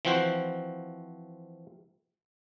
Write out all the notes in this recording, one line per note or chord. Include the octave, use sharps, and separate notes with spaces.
E3 F3 C4 F#4 C5